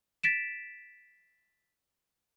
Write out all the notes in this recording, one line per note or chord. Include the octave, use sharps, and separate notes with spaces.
A6 B6 D7 E7